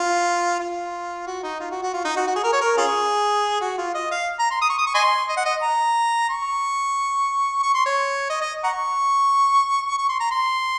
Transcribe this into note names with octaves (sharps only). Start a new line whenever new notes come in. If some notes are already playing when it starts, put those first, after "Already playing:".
Already playing: F4
F4
F#4
D#4
F4
F#4
F#4
F4
D#4
F#4
F#4
G#4
A#4
C#5
A#4
C#4 F4 G#4
F#4
F4
D#5
F5
A#5
C6
D#6
C#6
D#6
C#6
D#5 G#5 C6
D#5
F#5
D#5
A#5
C#6
C#6
C6
C#5
D#5
D#5
F#5 A#5 C#6
C#6
C6
A#5
C6